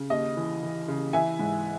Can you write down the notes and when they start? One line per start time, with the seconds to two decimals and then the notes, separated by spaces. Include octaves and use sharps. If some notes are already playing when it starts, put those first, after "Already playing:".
Already playing: C#3
0.10 D#2 D#5
0.36 E3
0.62 E3
0.88 C#3
1.13 E3 E5 G#5
1.39 G#2